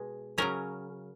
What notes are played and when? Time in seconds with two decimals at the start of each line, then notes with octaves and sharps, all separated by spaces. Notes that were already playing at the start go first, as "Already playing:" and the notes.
Already playing: B2 G#3
0.38 C#3 F#3 C#4 A#4